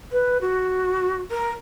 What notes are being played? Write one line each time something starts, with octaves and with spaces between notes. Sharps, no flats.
B4
F#4
A#4